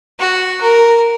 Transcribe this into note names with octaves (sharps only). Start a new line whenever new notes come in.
F#4
A#4